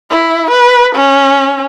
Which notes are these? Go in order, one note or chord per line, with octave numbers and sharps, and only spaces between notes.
E4
B4
C#4